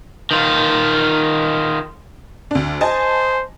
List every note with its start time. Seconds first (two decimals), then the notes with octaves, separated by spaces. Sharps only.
0.31 D#3 F4
2.51 D2 D4
2.81 C5 D#5 G#5 A5